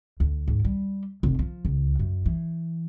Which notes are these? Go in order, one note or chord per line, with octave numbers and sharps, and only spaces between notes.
D2
G#2
G3
F1
F3
C#2
F#2
E3